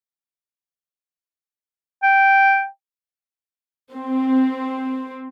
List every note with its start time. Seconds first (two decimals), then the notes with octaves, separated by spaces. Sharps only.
2.03 G5
3.92 C4